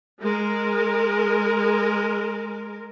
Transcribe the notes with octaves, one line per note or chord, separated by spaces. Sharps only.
G#3 A#4